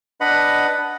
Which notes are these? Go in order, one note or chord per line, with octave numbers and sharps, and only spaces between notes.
D4 B4 D#5 F#5 B5